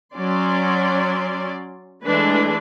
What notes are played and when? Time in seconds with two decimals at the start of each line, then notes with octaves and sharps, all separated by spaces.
0.15 F#3 C#4 D5 C6
2.04 E3 G#3 A3 D4 B4